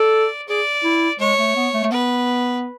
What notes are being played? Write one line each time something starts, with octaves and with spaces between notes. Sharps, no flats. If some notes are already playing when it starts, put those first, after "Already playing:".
Already playing: A4 D5
G#4 D5
E4
G#3 C#5
A3
B3
A3
A3
B3 B4